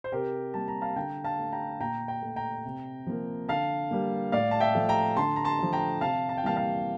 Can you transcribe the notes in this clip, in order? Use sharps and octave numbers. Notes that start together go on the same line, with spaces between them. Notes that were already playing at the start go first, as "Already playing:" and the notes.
C5
C3 G4 A#4
G3 A#3 A5
A#5
F5 A5
D3 G5 A#5
F5 A5
A3
G5 A#5
A#2 G5 A#5
G5 A#5
A3
G5 A#5
C3
F3 A#3
D3 F5 A5
G3 A#3
A2 D5 F5
A5
E5 G5
F3 A3
G5 A#5
D3 A5 C6
A#5
A5 C6
F3 A3
G5 A#5
C3 F5 A5
A5
G5
E3 G3 A#3 F5 A5
F5 A5